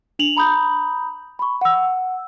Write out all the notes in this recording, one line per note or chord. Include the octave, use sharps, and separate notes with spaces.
D4 F7 F#7
A#5 B5 D#6 G6
B5 C#6
F#5 E6